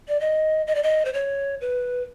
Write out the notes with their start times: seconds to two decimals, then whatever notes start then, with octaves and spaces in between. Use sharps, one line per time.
0.08 D5
0.20 D#5
0.67 D#5
0.75 D5
0.83 D#5
1.05 C5
1.14 C#5
1.61 B4